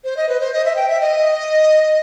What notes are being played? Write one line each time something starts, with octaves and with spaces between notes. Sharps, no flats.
C5
D#5
B4
C5
D#5
E5
G5
E5
D#5